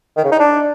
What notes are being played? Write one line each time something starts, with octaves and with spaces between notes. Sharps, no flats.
D#3
C#3
D#4
D4